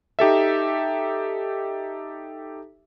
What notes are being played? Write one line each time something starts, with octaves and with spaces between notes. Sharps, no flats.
D#4 G4 A4 E5